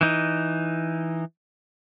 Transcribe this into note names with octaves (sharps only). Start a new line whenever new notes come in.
E3 D#4